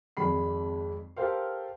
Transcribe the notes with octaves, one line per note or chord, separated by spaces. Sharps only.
G#1 F2 G#3 B5 C7
G4 A4 A#4 C5 F5